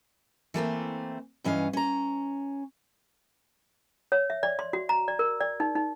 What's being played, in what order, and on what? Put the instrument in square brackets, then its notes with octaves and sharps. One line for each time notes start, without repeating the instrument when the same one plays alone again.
[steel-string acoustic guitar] E3 A3 A#3 C4
G2 E3 C#4 D#5 F5
C#4 A#5
[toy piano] C#5
E5
D5
C6
F#4
A#5
D5
A#4
D5
D#4
D#4